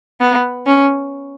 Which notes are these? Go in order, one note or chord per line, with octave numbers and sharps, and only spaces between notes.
B3
C#4